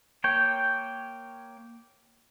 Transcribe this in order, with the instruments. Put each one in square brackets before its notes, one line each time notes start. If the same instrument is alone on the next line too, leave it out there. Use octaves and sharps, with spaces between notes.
[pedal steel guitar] A#3 C#5 G5